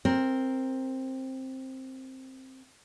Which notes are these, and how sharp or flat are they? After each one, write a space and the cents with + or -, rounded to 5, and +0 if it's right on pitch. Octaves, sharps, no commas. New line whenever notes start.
C4 +10 A#4 +0